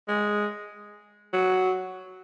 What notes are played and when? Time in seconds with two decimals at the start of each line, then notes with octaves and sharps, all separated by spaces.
0.08 G#3
1.33 F#3